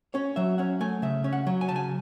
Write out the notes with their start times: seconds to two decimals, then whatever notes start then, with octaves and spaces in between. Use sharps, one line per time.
0.14 C#4 C#5
0.36 F#3 E5
0.58 C#4 F#5
0.81 A3 G#5
1.02 C#3 E5
1.24 C#4
1.33 F#5
1.47 F#3
1.61 G#5
1.69 C#3 A5
1.76 G#5